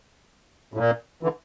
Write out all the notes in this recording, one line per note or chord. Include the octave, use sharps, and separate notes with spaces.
A2
A#2
D3 E3